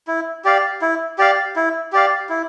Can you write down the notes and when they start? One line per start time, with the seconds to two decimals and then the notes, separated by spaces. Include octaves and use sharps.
0.07 E4
0.45 G4 D5 F5
0.82 E4
1.18 G4 D5 F5
1.56 E4
1.93 G4 D5 F5
2.29 E4